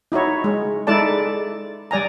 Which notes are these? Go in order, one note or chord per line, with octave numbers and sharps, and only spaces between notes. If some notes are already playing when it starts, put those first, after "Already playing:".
D#4 E4 F#4 C#5
G#3
G#3 D#4 E4 A4 D5 A5
G3 D5 G#5 A#5